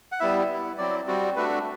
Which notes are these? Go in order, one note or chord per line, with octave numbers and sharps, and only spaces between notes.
F#5
G3 B3 E4 E5
B3 E4
F#3 C4 E4 D5
G3 C4 F#4
A3 D4 F#4 B4